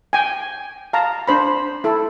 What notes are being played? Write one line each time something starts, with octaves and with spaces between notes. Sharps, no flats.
G5 G#5
F5 A5 A#5
D4 C5 B5
E4 A4